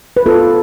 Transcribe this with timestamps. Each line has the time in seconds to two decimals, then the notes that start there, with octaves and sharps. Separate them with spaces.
0.17 B4
0.26 B3 F4 A4